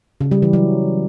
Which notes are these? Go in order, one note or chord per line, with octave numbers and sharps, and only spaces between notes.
C#3
G3
E3
F#3